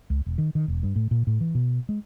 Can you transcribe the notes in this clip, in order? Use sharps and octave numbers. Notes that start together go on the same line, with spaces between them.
C#2
E1
D#3
D#3
E1
G2
A2
A#2
A2
E3
B2
G#3